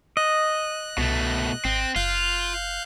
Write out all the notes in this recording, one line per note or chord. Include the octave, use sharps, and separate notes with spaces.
D#5 F#6
C2 B2 A3
G#1 C4
F#1 F4 F5 F#6 G6